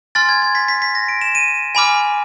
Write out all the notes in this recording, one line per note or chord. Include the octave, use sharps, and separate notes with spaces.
G#5 C6 F6 A6
G#6
G#6
B6
B6
B6
A#6
D7
E7
D#7
G#5 B5 D6 F6